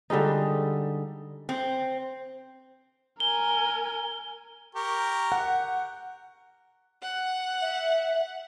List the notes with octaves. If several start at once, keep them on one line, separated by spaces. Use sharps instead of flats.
D3 G3 G#3 D#4
C4
A#4 G#5 G7
G4 A#4 C#6
F#5
F#5
E5